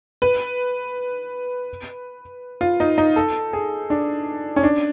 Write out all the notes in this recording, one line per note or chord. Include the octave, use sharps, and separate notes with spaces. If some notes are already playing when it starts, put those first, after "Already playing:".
B4
F4
D#4
D#4
A4
G#4
D4
C#4
D4